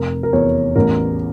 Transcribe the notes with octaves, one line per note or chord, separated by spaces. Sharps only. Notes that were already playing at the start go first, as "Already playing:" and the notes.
Already playing: F1 A#4
A#4
E2 C#5
A1 A#4